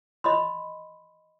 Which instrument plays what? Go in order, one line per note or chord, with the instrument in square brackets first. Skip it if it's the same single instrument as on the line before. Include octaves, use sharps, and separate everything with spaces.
[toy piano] D#5 B5 C6